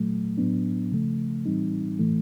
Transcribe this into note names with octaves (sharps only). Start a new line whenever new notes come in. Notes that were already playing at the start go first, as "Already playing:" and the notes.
Already playing: A#2 F#3 A3
A2 F#3 B3 D4
C#3 F3 A3
A2 E3 G3 C4 D#4
A2 E3 A3